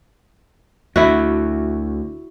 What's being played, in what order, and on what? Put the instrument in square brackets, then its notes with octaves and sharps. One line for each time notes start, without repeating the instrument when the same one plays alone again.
[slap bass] D2 [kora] E4 F#4